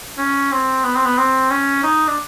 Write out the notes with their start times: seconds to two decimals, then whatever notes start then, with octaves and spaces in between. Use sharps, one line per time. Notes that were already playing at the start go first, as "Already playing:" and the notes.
0.18 C#4
0.52 C4
0.84 B3
0.95 C4
1.05 B3
1.18 C4
1.51 C#4
1.83 D#4
2.08 D4